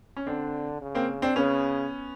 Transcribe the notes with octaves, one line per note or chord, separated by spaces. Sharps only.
C#4
D3 C4 D4
C#3
A#3 C4
C4 D4
C#3 B3 C#4